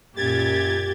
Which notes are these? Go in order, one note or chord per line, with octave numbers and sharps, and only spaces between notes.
F#2 A#2 G4 G#6 A6